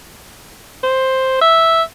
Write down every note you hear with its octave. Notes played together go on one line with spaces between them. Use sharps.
C5
E5